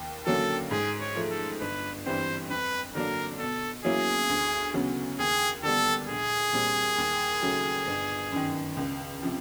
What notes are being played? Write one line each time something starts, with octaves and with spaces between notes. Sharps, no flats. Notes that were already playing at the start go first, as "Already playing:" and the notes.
Already playing: D#2
D3 F#3 A#3 C#4 A4
G#2 G#4
C#5
F3 A3
A4
G1 B4
G2 E3 G3 C4 C5
F2 B4
D3 F#3 A#3 D4 A#4
B2 A4
F#3 A#3 C#4 E4 G#4
D2
C#3 F#3 B3
D#2 G#4
D3 G3 B3 D4 A4
A#1 G#4
A#2 G3 C4
D#2
C#3 F#3 A3
G1
F#2 D#3
C#2
C3 F3